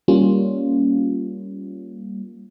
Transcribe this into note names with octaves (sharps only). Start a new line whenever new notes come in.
G3 A#3 C#4 F4